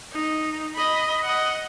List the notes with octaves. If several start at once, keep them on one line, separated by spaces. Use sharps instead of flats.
D#4
D#5 B5
D#5 F#5